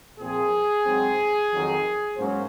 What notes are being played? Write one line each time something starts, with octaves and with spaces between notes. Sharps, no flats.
A#2 F3 C4 G#4
G#2 F#3 C4
F2 D#3 F#3
G#2 F#3 A#3 C#4 C5